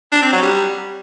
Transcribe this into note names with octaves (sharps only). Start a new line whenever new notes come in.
D4
C4
F#3
G3